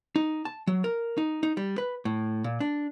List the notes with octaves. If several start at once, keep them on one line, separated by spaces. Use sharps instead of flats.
D#4
A5
F#3
A#4
D#4
D#4
G3
B4
A2
A#2
D4